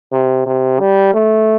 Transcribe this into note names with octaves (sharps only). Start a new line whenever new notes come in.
C3
C3
G3
A3